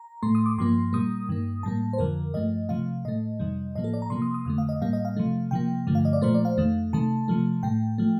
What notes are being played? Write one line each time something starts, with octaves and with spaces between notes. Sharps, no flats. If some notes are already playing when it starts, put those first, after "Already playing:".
Already playing: A#5
A2 A3 C6
D#6
D6
G2 F3 A#3 C6
A#2 G3 A#3 D#6
G2 D#3 A#3
A2 G3 A#3 A5
C5
F2 D3 F3 A#4
G2 F3 A3 D#5
C3 F3 A3 F5
A2 A3 D#5
F2 C3 D#3 G3
A2 F3 A#3 D#5
A4
D5
A#5
C3 F3 A#3 C6
D#6
D#6
F2 D3 A3 D#6
F5
D#5
A2 G3 A#3 F5
D#5
F5
C3 F3 A3
C3 F3 A#3 G5
G2 D3 F3 A3
F5
D#5
D5
A#2 F3 A3 C5
D5
F5
F2 D#3 A3
C3 D#3 A3 A5
C3 F3 A3
A2 A3 G5
F3 A3